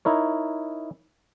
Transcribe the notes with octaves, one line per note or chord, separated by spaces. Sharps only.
D#4 E4 A#4 C#5